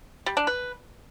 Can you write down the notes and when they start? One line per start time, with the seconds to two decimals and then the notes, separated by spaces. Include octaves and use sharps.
0.26 G3
0.37 D4
0.47 B4